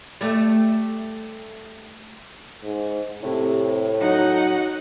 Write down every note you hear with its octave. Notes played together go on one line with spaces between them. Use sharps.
G3 A3
G#2
A2 C3
F#3 D#4 F#5